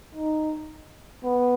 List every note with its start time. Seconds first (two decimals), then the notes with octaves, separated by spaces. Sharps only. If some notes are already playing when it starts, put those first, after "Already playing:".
0.15 D#4
1.24 B3